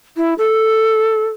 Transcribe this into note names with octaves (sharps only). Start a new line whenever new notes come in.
E4
A4